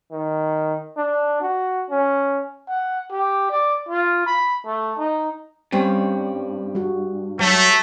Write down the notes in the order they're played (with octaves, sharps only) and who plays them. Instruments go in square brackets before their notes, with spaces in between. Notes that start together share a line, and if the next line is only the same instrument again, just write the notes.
[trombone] D#3
D4
F#4
C#4
[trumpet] F#5
G4
D5
F4
B5
A3
D#4
[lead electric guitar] G2 [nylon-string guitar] G3 C4 C#4
[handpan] G3 F#4
[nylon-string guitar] F#3 [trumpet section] A3